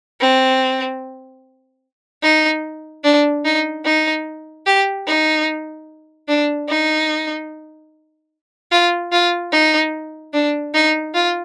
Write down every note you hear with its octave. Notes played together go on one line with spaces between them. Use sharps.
C4
D#4
D4
D#4
D#4
G4
D#4
D4
D#4
F4
F4
D#4
D4
D#4
F4